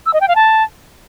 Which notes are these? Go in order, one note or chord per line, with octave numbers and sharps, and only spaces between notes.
E6
D#5
G5
F5
A5